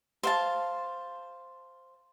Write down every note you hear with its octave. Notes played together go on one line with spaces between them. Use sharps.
C5 F5 A5